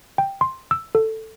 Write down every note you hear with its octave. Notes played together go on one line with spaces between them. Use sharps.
G5
C6
E6
A4